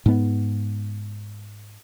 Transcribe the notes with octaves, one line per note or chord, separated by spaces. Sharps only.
G#2 B3